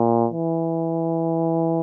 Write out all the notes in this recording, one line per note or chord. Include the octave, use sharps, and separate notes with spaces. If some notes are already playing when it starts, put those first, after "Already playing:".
Already playing: A#2
E3